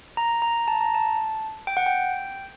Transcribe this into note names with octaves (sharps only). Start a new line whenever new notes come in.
A#5
A#5
A5
A#5
A5
G5
F#5
G5